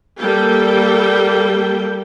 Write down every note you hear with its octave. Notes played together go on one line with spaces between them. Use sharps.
G3 A#3 A4 G5